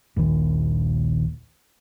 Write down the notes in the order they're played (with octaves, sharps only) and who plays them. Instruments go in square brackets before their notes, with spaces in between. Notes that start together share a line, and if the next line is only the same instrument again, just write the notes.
[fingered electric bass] D#1 A#1 D#2 D#3